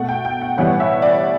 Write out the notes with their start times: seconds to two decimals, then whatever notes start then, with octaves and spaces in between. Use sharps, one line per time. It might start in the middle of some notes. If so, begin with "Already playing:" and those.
Already playing: B2 A3 F#5
0.09 G5
0.25 G5
0.41 F#5
0.58 A2 E3 G3 B3 F#5
0.80 E5
1.02 D5